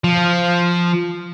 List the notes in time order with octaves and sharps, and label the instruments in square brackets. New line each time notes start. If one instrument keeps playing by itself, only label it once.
[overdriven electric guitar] F3